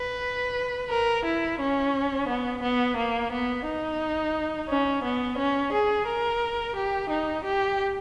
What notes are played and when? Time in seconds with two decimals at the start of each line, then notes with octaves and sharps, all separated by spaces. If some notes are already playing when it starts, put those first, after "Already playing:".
Already playing: B4
0.91 A#4
1.25 E4
1.60 C#4
2.28 B3
2.63 B3
2.97 A#3
3.32 B3
3.66 D#4
4.69 C#4
5.04 B3
5.38 C#4
5.73 G#4
6.06 A#4
6.76 G4
7.10 D#4
7.44 G4